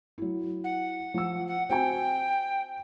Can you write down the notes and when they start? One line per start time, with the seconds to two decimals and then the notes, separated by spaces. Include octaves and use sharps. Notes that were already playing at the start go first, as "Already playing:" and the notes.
0.18 F#3 E4
0.64 F#5
1.14 F3 E6
1.47 F#5
1.69 C4 F#4 G5 G#5